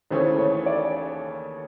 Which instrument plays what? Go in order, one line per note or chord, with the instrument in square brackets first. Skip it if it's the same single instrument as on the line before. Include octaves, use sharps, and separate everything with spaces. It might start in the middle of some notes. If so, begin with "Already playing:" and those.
[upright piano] D#2 C#3 E3 A3 C#4 [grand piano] C5
[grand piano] C#5
D5